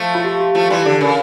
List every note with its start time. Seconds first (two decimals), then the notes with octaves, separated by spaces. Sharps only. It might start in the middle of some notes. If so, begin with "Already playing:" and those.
Already playing: F3 A3
0.15 F4
0.25 G4
0.40 G4
0.55 F3 A3 F4
0.70 E3 G3 G4
0.85 D3 A4
1.01 C#3 A#4